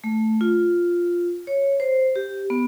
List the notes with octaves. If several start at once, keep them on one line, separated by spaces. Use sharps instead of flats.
A3
F4
C#5
C5
G4
B3